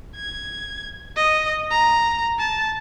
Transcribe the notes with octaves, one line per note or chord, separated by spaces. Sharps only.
G#6
D#5
A#5
A5